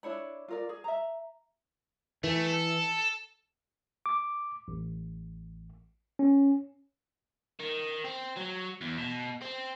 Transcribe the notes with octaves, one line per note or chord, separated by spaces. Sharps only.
D4 E4 C#5 B5
F4 A#4 D5
G#4
E5 A#5
E3 A3
A4
D6
A1
C#4
D#3
C4
F#3
E2
B2
C4